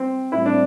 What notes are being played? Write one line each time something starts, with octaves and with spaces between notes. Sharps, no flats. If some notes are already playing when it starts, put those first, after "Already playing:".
Already playing: C4
A2 G3 C4 E4
D4